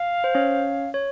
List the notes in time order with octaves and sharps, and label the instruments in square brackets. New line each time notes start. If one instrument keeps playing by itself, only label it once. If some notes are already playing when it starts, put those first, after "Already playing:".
Already playing: [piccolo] F5
[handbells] C5
C#4 C#5
C#5